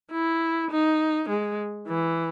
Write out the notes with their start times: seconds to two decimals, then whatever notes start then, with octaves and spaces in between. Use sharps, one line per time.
0.11 E4
0.71 D#4
1.29 G#3
1.88 E3